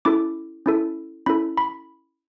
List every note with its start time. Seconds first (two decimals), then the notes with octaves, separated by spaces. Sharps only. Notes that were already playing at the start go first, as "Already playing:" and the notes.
0.05 C#4 E4 A4 D6
0.66 C#4 E4 A4
1.26 C#4 E4 A4 B5
1.57 B5